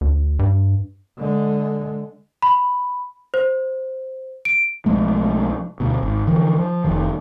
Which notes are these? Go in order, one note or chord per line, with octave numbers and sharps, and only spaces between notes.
D2
G2
D3 G#3
B5
C5
D7
B1 F3 G#3 A3
D2 B2
G#1
D3 E3 F3
F3
F1 F2 D#3